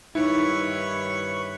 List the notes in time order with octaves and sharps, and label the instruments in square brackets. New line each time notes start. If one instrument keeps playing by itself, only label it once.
[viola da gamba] G2 D#3 C#5 [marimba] D#4 [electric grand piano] E4 [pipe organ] B4 C#6